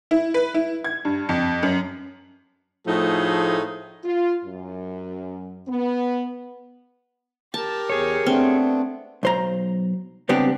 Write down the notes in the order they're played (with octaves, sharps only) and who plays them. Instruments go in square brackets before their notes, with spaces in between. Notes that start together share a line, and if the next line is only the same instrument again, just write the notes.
[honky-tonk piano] E4
B4
E4
G#6
G2
F2
F#2
[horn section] A2 F3 A3 D#4 G#4
[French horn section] F4
F#2
B3
[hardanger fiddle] G4 A#4 [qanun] A5
[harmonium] E2 [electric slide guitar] G#4 C#5
[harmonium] A3 B3 D4 [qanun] C4
[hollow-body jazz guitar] B1 C5 A#5
C#2 G3 B3 C4 D4 G4